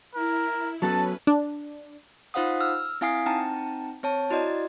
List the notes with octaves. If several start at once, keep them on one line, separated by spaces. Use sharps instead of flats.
E4 A#4
F#3 B3 C#4 A4 B4 A5
D4
D#4 F4 C5 F5 F#5 D#6
E6 F6
C4 E4 F5 G#5 D#6 C7
C4 D#4 G5 A5 A#5
C4 C#5 A5
E4 F#4 D5 D#5